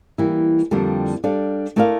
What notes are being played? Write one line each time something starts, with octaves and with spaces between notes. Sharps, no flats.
E3 G3 A#3 E4
F2 D3 G3 A#3 E4
G3 D4 A4 D5 F5
A3 E4 A#4 D5 F5